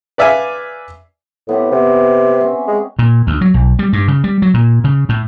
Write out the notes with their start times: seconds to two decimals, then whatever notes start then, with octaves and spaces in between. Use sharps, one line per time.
0.18 B4 D5 E5 F5 G#5
1.49 A2 B3 C4 G4
1.71 C3 B3
2.27 E5
2.41 C4 C#4
2.68 G#3
2.99 A#2
3.27 D2
3.41 F#3
3.54 B1
3.79 G3
3.93 G2
4.08 C#3
4.24 G3
4.42 F#3
4.54 A#2
4.84 C#3
5.09 A2